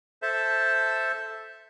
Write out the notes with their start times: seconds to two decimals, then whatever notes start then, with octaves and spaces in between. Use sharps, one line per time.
0.22 A4 C5 E5 A5